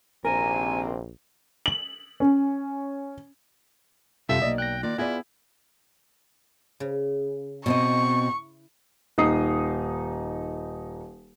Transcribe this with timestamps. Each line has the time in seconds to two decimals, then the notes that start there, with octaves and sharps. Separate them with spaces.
0.25 A#1 C3 D#3 C4 A#4 G#5
1.66 F#7
2.20 C#4
4.29 F#2 C3 G3 F4 A4 E5
4.42 B1 A#3 D5 D#5
4.58 G5 F#6 A#6
4.83 D#3 A#3 F4 D5
4.98 B3 E4 F4 G#4 D5
6.80 C#3
7.66 B2 C4 E4 D#5 C#6
9.18 D#1 D#4 D#6 C7